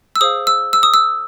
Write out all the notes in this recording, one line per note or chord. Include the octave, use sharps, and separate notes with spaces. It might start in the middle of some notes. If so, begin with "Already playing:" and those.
E6
G#4 C5 F5 D#6
E6
E6
D#6
E6